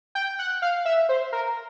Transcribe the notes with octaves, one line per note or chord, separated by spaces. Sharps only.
G5
F#5
F5
E5
C5
A#4